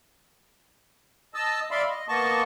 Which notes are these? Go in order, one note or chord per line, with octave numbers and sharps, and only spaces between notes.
D#5 A5 E6
D5 E5 F5 B5 C6
D#5
A#3 B3 D#5 A5 C#6